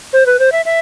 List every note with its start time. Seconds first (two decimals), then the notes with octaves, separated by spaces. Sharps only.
0.13 C5
0.26 B4
0.39 C5
0.52 E5
0.65 E5